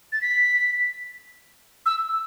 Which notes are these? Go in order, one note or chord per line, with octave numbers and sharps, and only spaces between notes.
A6
B6
E6